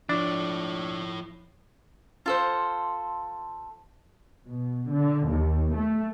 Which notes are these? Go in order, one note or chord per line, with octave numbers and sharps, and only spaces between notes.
F3 D4 E4 C#5
F4 A4 C5
B2
D3
D#2
A3